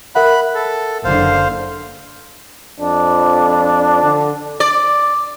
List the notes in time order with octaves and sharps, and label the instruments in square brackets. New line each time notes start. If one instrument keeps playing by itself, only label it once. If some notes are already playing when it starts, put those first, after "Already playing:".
[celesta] A#4 E5 F#5 [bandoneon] B5 F#6
[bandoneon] A4
[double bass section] F#1 D3 [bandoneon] C5 F5
[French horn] F2 [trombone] D4
[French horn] D3
[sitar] D5